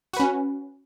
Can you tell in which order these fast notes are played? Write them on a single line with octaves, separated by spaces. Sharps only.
F#4 B4 C#4